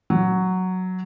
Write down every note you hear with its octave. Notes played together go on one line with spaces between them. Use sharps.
F#3